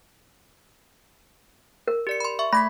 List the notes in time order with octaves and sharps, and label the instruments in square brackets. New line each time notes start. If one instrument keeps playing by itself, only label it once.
[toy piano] A#4
[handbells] G4 D5 C#7
B5 C6
E5 C#6
[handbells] A3 G#6 B6 [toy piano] B5